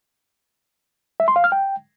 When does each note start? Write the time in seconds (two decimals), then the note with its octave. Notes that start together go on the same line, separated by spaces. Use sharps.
1.20 E5
1.28 C6
1.36 F5
1.44 F6
1.52 G5